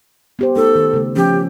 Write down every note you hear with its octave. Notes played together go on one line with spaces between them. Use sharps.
B3 G4 C5
A3 D#4 A4
D#3
C#3 A3
F3 C#4 G4